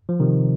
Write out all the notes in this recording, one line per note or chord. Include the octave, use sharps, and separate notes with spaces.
F3
C3 D#3